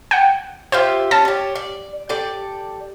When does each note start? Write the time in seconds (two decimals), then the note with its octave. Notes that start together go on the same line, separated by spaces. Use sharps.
0.11 F#5 G5
0.72 F4 G4 C5 E5
1.11 C#4 A5
1.25 G4 C#5
1.55 D5
2.09 G4 A4 D5